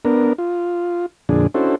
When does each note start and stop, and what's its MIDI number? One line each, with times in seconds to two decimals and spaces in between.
0.05 0.33 59
0.05 0.33 62
0.05 0.33 70
0.38 1.06 65
1.29 1.47 41
1.29 1.47 46
1.29 1.47 50
1.29 1.47 62
1.29 1.47 68
1.54 1.75 61
1.54 1.75 62
1.54 1.75 64
1.54 1.75 66
1.54 1.75 69
1.54 1.75 72